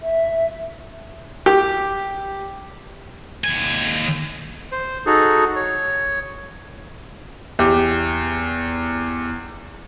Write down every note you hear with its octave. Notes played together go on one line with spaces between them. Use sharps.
E5
G4
D#2 G#5
C5
D#4 F#4 G#4 A4
C#5
E2 G4